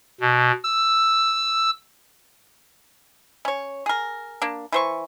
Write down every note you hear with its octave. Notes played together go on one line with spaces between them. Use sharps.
B2
E6
C#4 C#5
G#4 A#4
A#3 D4
E3 C5 C#6